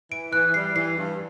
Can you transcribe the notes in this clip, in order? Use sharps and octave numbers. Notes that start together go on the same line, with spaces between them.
E3 D7
E3 F#6
G3 C7
E3 C7
G2